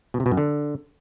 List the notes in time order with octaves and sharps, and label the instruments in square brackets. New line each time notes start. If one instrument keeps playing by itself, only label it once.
[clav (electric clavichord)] B2
C3
B2
F#2
D3